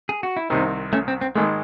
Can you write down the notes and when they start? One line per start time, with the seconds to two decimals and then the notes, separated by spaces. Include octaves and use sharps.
0.09 G#4
0.23 F#4
0.37 E4
0.50 C2 C3 D#3 C4 D#4
0.93 A3 C#4
1.08 C4
1.21 C4
1.35 G#1 G#2 D#3 G#3 A3